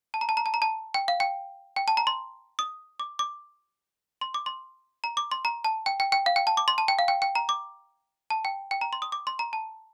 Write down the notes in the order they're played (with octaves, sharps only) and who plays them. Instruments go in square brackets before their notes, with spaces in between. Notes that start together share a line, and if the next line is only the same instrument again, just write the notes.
[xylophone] A5
A#5
A5
A#5
A5
A#5
A5
G5
F5
G5
G5
A5
A#5
C6
D#6
D6
D6
C6
D6
C6
A#5
D6
C6
A#5
A5
G5
G5
G5
F5
G5
A5
D6
C6
A5
G5
F5
G5
G5
A#5
D6
A5
G5
G5
A#5
C6
D#6
D6
C6
A#5
A5